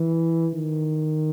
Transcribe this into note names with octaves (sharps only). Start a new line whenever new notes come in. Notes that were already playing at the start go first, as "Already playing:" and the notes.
Already playing: E3
D#3